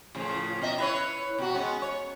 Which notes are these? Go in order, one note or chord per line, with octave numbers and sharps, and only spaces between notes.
A2 C#3 F3
B2 D#5 E5
E4 B4 C#5
B2 F#4
G#3 B3 C#4
C#5